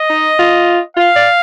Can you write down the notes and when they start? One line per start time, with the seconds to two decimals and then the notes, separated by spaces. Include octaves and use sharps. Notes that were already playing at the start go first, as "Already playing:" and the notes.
Already playing: D#5
0.10 D#4
0.39 F4
0.97 F4 F5
1.16 D5